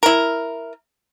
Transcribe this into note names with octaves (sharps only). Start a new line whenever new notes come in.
E4 A#4